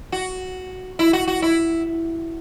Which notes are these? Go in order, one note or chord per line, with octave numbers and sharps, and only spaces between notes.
F#4
E4
F#4
F#4
E4